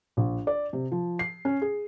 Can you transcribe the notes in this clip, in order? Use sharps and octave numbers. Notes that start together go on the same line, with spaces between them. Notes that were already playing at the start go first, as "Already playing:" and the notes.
A#1
D5
C3
F3
C7
C#4
G#4